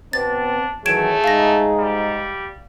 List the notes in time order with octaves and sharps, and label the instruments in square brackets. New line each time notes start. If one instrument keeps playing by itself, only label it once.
[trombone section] B2 B3 C4 [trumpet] D4 [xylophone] A6
[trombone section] D#3 E3 F#3 [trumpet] A3 [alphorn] G#4 [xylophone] G#6 D7 E7
[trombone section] G#2 D#4 [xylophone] F5 A#6
[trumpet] G3